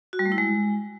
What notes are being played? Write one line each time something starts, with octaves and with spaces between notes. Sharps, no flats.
F#4
G3
A3
E4
G#3